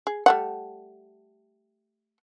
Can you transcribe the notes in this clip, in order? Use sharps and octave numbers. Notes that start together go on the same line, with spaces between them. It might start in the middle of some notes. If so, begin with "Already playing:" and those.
G#4
G3 A3 F#5